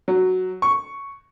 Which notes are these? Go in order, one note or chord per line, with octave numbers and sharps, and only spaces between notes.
F#3
C#6